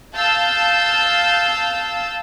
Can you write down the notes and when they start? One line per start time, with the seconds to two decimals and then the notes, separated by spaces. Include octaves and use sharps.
0.14 F5 A5 E6 G6